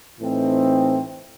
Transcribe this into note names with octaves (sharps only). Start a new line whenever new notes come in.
A2 E3 A3 C4 D#4